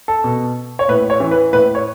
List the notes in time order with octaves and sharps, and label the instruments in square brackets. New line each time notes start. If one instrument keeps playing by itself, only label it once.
[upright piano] A4
B2
C#5
A2 B4
C#5
E3
B4
A2 B4
C#5